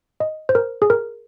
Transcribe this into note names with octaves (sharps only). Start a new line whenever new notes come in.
D#5
C5
A#4
G#4
A#4